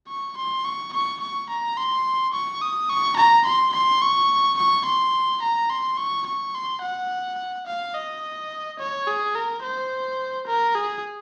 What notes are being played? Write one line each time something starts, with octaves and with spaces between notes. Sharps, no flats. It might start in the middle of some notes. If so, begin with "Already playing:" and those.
C#6
C6
C#6
C#6
C#6
A#5
C6
C#6
D#6
C#6
A#5
C6
C6
C#6
C#6
C6
A#5
C6
C#6
C#6
C6
F#5
F5
D#5
C#5
G#4
A#4
C5
A#4
G#4